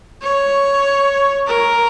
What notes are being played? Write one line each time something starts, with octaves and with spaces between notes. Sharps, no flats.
C#5
A#4